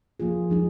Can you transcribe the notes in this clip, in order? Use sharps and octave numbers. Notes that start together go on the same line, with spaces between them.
F3 A#3 F4 G#4
F3 G#3 D#4 G#4